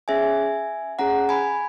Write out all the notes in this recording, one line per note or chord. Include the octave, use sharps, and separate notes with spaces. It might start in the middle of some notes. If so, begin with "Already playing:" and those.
C#4 G#4 E5 G#5
C#4 G#4 F#5 A#5
G#5 B5